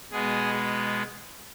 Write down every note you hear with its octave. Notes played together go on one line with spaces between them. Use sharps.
B2 G#3 B3 G#4